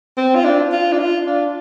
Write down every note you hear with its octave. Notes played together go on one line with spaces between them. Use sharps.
C4
F4
D4
F4
D4
F4
D4